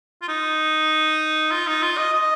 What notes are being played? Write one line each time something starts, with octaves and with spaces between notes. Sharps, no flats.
F4
D#4
F4
D#4
F4
D#5
D#5